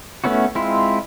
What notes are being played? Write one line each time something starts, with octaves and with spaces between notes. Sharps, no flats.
A3 B3 C#4 E4 F#4
G#3 C4 E4 F4